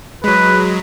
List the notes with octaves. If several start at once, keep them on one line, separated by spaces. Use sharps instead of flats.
F#3 G#3 B4